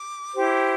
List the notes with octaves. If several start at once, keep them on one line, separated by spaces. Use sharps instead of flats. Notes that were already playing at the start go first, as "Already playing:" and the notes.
Already playing: D6
E4 G4 C5